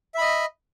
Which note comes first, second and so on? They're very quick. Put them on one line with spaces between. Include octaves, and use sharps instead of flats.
E5 B5 D#5